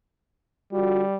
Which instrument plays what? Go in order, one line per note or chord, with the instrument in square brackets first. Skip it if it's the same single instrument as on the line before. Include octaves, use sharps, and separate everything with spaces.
[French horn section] D3 F4 F#4 [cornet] G3